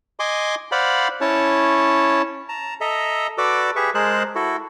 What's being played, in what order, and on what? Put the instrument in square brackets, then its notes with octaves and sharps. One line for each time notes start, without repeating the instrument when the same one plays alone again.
[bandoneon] D#5 G#5 C6 D6
C5 D5 F5 F#5 B5
C#4 E4 C#5 A5
[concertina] A5 A#5
A4 D#5 E5 A#5
F#4 A4 B4 D5 D6 E6
G4 G#4 B4 E5 C#6
G#3 G#4 A#4 C5 A5 F#6
E4 F#4 A4